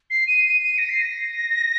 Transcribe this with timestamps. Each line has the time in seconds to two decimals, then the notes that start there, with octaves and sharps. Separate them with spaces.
0.10 C7
0.27 D#7
0.44 D#7
0.61 D#7
0.78 A#6
0.89 C7
1.01 A#6